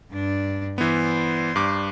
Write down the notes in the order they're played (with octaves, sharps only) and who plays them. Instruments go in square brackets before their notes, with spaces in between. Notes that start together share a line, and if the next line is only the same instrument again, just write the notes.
[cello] G2 D4
[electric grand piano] E3 B3 [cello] C5 D5
[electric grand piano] G2 D6